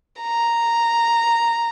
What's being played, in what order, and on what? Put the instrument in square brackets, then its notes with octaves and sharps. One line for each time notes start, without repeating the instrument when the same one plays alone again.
[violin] A#5